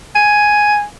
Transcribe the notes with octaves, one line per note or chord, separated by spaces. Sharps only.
G#5